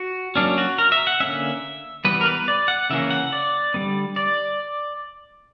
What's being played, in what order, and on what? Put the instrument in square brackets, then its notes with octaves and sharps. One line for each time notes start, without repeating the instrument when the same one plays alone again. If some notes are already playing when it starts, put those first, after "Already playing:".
Already playing: [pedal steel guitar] F#4
F#3 A#3 C#4 D4
F#4
A#4
E5
F#5
D3 A#3 C#4 E5
E3 G3 B3 B4
A#4
B4
D5
F#5
C#3 E3 A#3 C#4 E5
F#5
D5
D3 G3 B3
D5